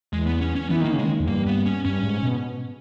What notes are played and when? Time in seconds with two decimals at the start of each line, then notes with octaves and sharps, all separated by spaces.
0.13 E2 G#3
0.27 B3
0.41 C#4
0.55 C#4
0.70 E3 B3
0.81 D#3 A#3
0.93 C#3
0.99 G#3
1.05 D#3
1.20 E2
1.27 G2 A#3
1.47 B3
1.65 C#4
1.85 G2 C#4
2.03 G#2
2.23 B2